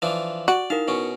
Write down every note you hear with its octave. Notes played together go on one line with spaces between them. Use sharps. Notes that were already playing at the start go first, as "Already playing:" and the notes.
E3 F3 D4
F#4 D5
D#4 E4 A#4 F5
B2 C#4